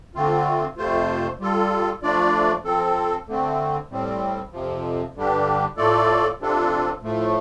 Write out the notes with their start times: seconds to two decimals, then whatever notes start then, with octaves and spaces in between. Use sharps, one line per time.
0.15 D3 A3 C4 F4
0.77 F2 C3 A3 F4 C5
1.40 G3 F4 A4
2.02 F3 A3 D4 F4 D5
2.64 F3 C4 A4
3.27 D3 A3 C4
3.90 A2 G3 C4
4.52 F2 C3 F3
5.15 G2 D3 G3 D4 G4
5.77 A2 A3 F4 A4 D5
6.39 C3 F3 D4 F4 A4
7.02 A2 F3 A3